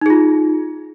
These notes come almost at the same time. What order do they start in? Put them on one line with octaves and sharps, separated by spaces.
D#4 G#4 F4